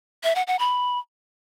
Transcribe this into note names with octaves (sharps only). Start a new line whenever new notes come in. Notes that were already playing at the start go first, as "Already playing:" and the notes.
E5
F#5
F#5
B5